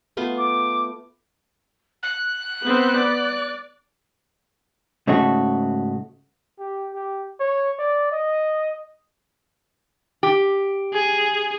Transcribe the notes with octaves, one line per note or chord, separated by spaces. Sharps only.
A3 B3 F4
D6
F#6
B3 C4
D5
G#2 C#3 A3 F#4
G4
G4
C#5
D5
D#5
G4
G#4